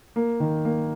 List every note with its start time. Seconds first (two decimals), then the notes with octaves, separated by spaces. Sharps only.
0.16 A#3
0.40 D#3
0.65 A#3